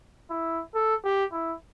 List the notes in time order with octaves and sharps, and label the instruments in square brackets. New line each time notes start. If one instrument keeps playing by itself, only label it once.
[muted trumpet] E4
A4
G4
E4